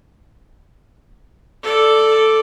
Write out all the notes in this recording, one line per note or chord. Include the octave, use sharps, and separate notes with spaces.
A4 D5